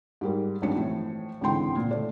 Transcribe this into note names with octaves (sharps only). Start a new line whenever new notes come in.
G#2 G3 A#4
G#1 G2 F3 C#4 C#7
A2 E3 F3
G#1 C#2 D3 E3 G5 C6
A#2
A3 D5